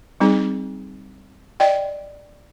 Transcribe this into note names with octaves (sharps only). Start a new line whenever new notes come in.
G3 C4 D#4 G#4
D5 D#5 G5